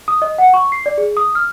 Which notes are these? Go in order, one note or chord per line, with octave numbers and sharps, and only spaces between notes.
D#6
D#5
F#5
C#6
C7
D5
G#4
D#6
F6